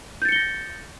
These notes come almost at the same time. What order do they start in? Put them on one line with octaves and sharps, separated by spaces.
G6 A6 C#7 G7 A#6